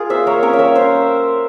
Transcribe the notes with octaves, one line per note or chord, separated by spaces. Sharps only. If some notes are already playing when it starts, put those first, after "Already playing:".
Already playing: F4 G#4 A#4
A#3 C5 E5
A#3 A#4 C#5
C#4 A#4 C#5
E5
G3 A#4 C#5
C#4 C5 E5